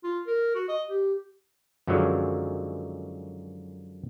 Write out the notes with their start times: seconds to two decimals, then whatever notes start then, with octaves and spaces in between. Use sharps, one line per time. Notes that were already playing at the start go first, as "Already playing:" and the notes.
0.03 F4
0.27 A#4
0.55 F#4
0.68 D#5
0.89 G4
1.87 F#2 D3 D#3 F3 F#3 G#3